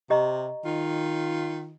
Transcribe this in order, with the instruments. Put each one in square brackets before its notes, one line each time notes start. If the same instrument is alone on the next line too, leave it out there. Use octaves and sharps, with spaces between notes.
[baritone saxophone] C3 [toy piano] G4 D#5 A#5
[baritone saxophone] D#3 [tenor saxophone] F4